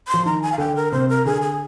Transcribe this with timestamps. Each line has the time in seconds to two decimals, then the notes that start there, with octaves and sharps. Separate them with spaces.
0.08 C6
0.14 F3
0.26 D#3 A#5
0.42 G#5
0.52 F5
0.58 D3 G5
0.76 A#4
0.92 C3 C5
1.09 A#4
1.25 D3 G#4
1.42 G#4